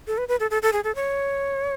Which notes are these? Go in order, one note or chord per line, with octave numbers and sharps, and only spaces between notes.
A4
B4
B4
A4
A4
A4
G#4
A4
C#5